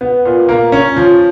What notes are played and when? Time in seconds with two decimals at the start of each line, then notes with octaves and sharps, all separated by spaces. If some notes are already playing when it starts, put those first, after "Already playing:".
0.01 B3
0.25 A#2
0.49 A#3
0.72 C#4
0.96 F3